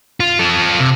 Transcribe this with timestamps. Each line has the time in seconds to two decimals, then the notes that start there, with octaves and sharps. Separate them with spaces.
0.20 F4
0.39 F4 A4
0.80 C3